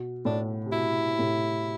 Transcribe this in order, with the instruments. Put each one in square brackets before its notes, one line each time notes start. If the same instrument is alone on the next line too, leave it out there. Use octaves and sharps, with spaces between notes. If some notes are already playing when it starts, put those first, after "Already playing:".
Already playing: [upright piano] B2
[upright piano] A2 [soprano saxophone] D4
[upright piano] C3
[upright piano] B2 [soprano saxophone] E4
[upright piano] A2 C3